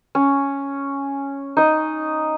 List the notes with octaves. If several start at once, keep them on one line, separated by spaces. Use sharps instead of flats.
C#4
D#4 D#5